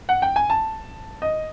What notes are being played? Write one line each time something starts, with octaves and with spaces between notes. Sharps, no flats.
F#5
G5
G#5
A5
D#5